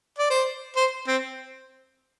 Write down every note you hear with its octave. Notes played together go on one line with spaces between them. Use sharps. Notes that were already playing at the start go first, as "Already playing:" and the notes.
D5
C5
C5
C4